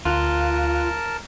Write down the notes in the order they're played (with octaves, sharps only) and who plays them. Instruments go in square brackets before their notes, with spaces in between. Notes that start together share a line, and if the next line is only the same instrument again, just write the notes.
[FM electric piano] D2 F#6 [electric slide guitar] F4 [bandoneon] A#4 A5